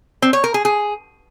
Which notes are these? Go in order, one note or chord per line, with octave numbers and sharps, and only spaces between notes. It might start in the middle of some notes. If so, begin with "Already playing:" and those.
C4
C#5
A#4
G#4
G#4